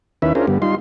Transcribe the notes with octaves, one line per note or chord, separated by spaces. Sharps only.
D#2 D#3 C#4 E4 B4 E5
C#4 D4 F4 G#4 A#4 C5
G2 D3 G3 B3
G3 D#4 F4 C6